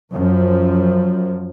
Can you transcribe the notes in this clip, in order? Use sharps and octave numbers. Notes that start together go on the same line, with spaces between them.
F#2 F3